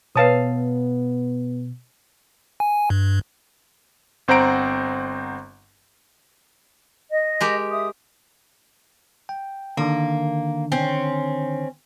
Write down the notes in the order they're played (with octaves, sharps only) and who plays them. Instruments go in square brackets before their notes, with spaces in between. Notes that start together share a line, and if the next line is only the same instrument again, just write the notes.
[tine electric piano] B2 [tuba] B3 [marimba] B4 C#5 [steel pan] F5 A5 D#6
[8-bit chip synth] G#5
G2
[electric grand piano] G1 C4 C5 F#5 A#5 D7
[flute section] D#5
[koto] G#3 G4 A#4
[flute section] E5 D#6
[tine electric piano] G5
[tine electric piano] D3 D#3 D4 [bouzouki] A#3
[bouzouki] C4 C#4